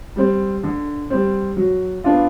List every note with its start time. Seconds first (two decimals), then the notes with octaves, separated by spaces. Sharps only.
0.16 G3 C4
0.63 D3
1.10 G3 C4
1.57 F#3
2.04 B3 D4 F4